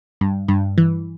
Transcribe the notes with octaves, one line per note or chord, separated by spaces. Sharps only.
G2
G2
E3